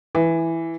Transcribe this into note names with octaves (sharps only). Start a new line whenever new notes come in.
E3